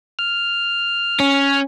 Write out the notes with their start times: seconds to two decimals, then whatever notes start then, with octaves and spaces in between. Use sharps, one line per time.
0.19 F6
1.20 C#4